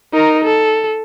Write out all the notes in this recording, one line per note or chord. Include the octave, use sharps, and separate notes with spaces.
D#4 A#4
A4